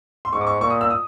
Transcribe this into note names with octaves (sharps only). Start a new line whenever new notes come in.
C6
G#2 C#6
D6
C#6
A#2 C#6
D#6
E6
D#6